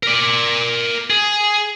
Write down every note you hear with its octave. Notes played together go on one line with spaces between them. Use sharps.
A#4 D5
G#4